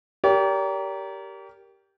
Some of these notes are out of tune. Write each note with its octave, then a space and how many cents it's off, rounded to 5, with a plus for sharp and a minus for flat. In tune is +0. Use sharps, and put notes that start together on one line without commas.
G4 -5 A#4 +0 D5 -45